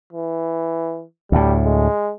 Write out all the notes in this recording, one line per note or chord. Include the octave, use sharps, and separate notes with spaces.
E3
D2 A2 G3
G#3